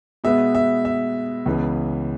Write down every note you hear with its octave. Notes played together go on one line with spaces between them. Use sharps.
B2 G#3 B3 E5
E5
E5
C#2 C#3 E3 B3